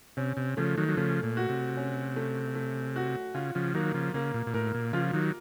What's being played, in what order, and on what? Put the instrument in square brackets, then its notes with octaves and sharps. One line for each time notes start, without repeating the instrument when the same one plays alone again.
[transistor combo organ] C3 [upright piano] C#4
[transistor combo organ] C3
[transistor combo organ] C#3 F3 [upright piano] A3
[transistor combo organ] D#3 F#3
F#3
[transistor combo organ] C#3 F3 [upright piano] A3
[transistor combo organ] A#2
[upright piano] F#4
[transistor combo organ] C3
[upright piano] C#4
A3
A3
F#4
[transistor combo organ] C#3 [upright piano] F4
[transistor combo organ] C#3 F3
[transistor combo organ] D#3 F#3 [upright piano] A#3
[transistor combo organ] C#3 F3
[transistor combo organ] C#3 [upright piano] A#3
[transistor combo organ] A#2
A#2
[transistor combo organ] A2 [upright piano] A#4
[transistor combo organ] A#2
[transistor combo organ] C#3 F3 [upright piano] F4
[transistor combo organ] D#3 F#3